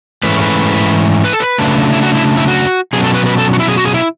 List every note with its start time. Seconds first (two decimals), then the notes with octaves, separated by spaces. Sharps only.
0.23 G#2 E3 A3 C#4 B4
0.41 B4
1.24 B4
1.33 A4
1.40 B4
1.58 C#3 F#3 A3 D4
1.92 E4
2.03 F#4
2.15 E4
2.37 E4
2.48 F#4
2.93 B2 F#3 C#4 G#4
3.04 A4
3.15 B4
3.26 B4
3.38 A4
3.53 F#4
3.60 E4
3.68 G#4
3.77 F#4
3.85 G#4
3.94 E4